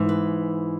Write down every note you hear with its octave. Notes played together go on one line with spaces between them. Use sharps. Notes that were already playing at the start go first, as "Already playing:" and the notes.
Already playing: G#2 E3
B4